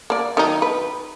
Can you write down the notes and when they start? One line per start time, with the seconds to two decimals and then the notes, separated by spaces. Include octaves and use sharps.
0.10 A#3 D5
0.37 D#3 F#3 D#4
0.62 B4